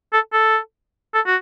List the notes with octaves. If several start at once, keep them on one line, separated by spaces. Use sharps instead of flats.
A4
A4
A4
F#4